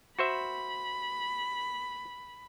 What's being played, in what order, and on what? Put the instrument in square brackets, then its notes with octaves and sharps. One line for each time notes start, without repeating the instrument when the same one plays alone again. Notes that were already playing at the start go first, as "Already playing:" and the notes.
[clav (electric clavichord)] F#4 C5 E5 [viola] B5